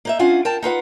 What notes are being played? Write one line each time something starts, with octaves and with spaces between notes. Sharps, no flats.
A#3 D#4 E5
C#4 D4 F4 F5 F#5 G#5
A#4 G5 A5
D#4 F4 B4 F#5